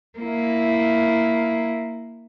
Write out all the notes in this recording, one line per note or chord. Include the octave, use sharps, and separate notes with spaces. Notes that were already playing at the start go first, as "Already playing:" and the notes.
A#3 E4